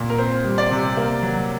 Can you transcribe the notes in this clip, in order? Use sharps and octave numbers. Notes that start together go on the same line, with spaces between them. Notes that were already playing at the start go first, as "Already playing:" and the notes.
Already playing: A#2
A#4
C4 C5
G3
D5
C3
A#3
F#3